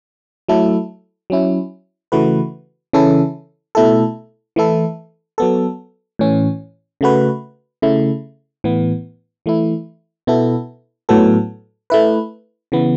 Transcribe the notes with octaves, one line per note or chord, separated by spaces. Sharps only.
F#3 A3 E4 A4
F#3 C#4 E4
C#3 E3 A3 F#4 B4
C#3 E3 C#4 E4 A4
B2 A3 E4 A4
E3 A3 E4 A4
F#3 B3 A4
A2 E3 C#4
C#3 A3 F#4 B4
C#3 A3 E4
A2 E3 B3
E3 A3 E4
B2 B3 E4 A4
A2 F#3 B3 A4
A3 E4 B4
C#3 E3 B3